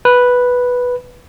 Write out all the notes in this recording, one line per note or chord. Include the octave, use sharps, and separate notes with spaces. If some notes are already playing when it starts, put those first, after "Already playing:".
B4